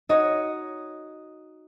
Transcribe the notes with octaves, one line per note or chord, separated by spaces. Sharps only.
D#4 F#4 C#5 D#5 D#6